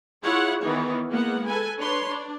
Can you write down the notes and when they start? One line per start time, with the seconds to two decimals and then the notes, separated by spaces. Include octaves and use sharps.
0.23 E4 F4 G#4 C#5 F#5
0.63 D#3 E3 B3 D#4 C#5
1.08 G#3 A#3 B3 F#5
1.46 A4 B4 G#5
1.77 D4 B4 C#5 C6
2.08 D4